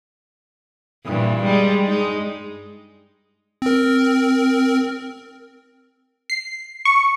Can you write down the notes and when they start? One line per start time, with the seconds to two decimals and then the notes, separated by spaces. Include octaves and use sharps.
1.05 G2 A#2 E3
1.42 G3 G#3
1.86 G#3 D#4
3.62 C4 A#4
6.30 C7
6.85 C#6